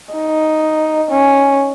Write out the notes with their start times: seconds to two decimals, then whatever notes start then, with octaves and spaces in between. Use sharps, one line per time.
0.14 D#4
1.11 C#4